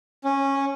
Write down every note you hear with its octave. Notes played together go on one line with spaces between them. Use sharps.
C#4